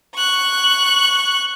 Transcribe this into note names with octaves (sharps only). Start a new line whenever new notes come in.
C#6 F#6